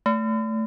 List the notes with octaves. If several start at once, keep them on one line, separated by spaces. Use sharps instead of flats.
A3